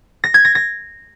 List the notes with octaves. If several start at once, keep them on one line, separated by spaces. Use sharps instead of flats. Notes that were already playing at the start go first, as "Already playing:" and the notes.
A#6
G#6
A#6
A#6